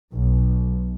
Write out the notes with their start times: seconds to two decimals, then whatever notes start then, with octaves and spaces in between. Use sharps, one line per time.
0.12 B1